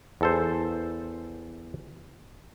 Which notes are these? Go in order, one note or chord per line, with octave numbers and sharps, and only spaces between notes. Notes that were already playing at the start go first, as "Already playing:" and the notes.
E2 A4 C5